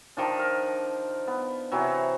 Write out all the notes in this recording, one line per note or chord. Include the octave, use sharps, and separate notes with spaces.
D#3 F3 D4
A#4
B3
C3 E3 F#3